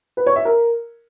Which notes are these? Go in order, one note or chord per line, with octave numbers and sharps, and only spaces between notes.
B4
C#5
E5
A#4